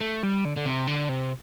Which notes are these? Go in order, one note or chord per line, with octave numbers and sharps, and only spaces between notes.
A3
G3
D3
D3
C3
D3
C3